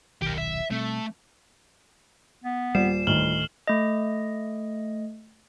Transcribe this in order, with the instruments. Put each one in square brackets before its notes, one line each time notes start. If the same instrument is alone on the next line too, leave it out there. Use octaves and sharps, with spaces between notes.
[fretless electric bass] D#1 B1 D#3 [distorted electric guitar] G4 A#4
[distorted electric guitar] E5
[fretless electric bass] B2 G3 C4 [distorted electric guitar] A3
[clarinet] B3
[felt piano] D#1 D5 [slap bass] G3 [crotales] C7 E7
[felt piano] D2 A2 D#3 [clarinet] F4 [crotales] F6 F#7 G7
[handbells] A3 D#5